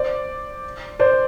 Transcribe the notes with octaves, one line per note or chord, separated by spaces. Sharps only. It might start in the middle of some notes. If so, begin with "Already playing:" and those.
Already playing: C5 D5
C5 D5